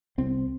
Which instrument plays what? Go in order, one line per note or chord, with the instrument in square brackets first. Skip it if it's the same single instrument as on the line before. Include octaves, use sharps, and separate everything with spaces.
[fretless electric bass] C2 C4